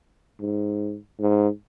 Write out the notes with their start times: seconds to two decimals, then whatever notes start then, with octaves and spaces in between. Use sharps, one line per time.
0.40 G#2
1.20 G#2